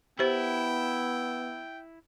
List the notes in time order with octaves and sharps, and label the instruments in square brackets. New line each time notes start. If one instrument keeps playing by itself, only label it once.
[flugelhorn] B3 [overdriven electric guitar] E4 [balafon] G4 C5 [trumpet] G5